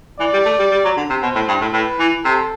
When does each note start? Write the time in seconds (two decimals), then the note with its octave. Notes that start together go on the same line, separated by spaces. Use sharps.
0.20 E3 D5
0.33 G3
0.46 A3
0.59 G3
0.71 G3
0.84 F#3
0.97 D3
1.10 C3
1.23 B2 C5
1.35 A2
1.48 G2
1.61 A2
1.73 A2 B4
1.99 E3
2.24 C3 A4